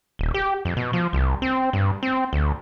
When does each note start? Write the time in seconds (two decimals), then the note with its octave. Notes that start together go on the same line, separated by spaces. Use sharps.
0.19 D#1
0.34 G4
0.65 F2
0.77 B2
0.93 F3
1.13 C2
1.42 C4
1.73 G2
2.03 C4
2.33 D2